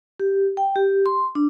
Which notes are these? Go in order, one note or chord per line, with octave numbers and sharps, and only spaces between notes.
G4
G5
G4
C6
D4